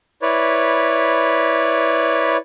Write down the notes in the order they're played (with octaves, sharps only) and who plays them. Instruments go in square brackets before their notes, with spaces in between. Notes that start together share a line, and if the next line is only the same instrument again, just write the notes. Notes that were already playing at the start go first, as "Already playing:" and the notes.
[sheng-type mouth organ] E4 B4 C#5 D5